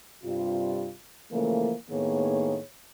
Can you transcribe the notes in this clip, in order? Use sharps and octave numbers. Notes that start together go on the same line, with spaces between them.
G2 C3 G3 F4
C#3 E3 F3 A3 A#3
A2 D#3 A#3 B3 G#4 C#5